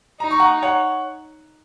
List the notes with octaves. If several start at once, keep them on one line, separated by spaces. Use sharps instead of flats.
D#4 A#5
C#6
F#5 A#5
C#5 F#5